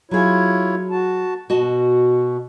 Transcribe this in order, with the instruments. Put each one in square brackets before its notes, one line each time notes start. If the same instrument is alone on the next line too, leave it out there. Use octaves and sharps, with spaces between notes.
[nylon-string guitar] F#3 G#4 [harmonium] E4 F4 C#5
[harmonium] F#4 A5
[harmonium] B2 [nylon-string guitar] F#4 D#5 A5